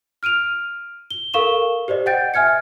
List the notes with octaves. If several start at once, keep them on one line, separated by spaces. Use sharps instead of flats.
F6 D7 D#7 F7
G7
A4 A#4 F5 C#6 E7 G7
G4 C5 D5 D#5
D#5 F#5 G5 G6 A6 D7
E5 G#5 F6 G#6 C#7